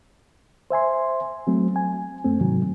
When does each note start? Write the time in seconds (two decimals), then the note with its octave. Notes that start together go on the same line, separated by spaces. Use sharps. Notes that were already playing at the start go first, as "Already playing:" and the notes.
0.71 C5 E5 G#5 C6
1.47 F#3 A3 C4
1.76 G#5
2.25 F#2 A3 C4
2.41 G#2 C3 D#3 F#3